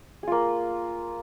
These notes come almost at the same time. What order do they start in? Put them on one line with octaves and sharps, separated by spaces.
G#4 F4 A#3